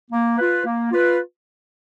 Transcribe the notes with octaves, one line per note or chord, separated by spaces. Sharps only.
A#3
F4 B4
A#3
F4 B4